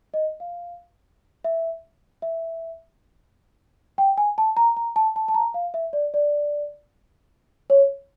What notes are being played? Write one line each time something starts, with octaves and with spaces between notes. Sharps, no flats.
D#5
F5
E5
E5
G5
G#5
A5
A#5
A#5
A5
A5
A5
A#5
F5
E5
D5
D5
C#5